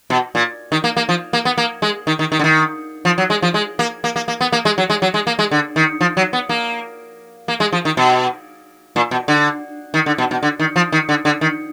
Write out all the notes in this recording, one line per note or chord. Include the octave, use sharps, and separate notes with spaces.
B2
A#2
D#3
A#3
A#3
F3
A#3
B3
A#3
G#3
D#3
D#3
D#3
D3
D#3
F3
F#3
G#3
F3
G#3
A#3
A#3
A#3
A#3
B3
A#3
G#3
F#3
G#3
F#3
G#3
A#3
G#3
D3
D#3
F3
F#3
B3
A#3
A#3
G#3
F3
D#3
B2
A#2
B2
D3
D#3
D3
B2
B2
D3
D#3
F3
D#3
D3
D3
D#3